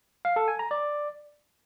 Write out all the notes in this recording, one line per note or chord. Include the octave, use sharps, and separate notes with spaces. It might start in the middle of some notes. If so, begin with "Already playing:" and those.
F5
A4
G#5
A#5
D5